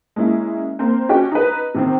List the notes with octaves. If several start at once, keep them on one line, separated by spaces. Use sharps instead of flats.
G#3 A#3 C#4 E4
A#3 C4 C5
C#4 F#4 G4 C#5 G5
D#4 B4
C3 D#3 C4